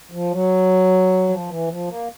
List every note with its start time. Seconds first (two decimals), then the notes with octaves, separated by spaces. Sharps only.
0.11 F3
0.32 F#3
1.29 F3
1.48 E3
1.68 F3
1.88 A#3